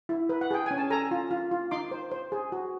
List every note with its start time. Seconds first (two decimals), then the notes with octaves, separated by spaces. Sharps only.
0.09 E4
0.29 B4
0.41 F#5
0.51 G#4 G5
0.66 C#4 G#5
0.78 A5
0.90 A4 G#5 A#5
1.11 F4
1.31 F4
1.51 F4
1.71 D#4 C6 D6
1.91 C5
2.11 C5
2.32 G#4
2.52 F#4